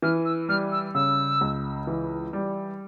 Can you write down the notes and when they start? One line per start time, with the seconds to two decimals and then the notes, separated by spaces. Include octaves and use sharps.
0.02 E3 F6
0.25 E6
0.49 G3 F6
0.72 E6
0.94 C#3 E6
1.41 C#2
1.87 E3
2.33 G3